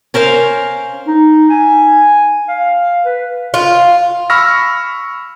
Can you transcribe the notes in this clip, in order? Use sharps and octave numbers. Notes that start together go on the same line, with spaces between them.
C#4 A#4 C5 F5
D#4
G#5
F5
B4
F4
B5 C#6 E6 F6 A#6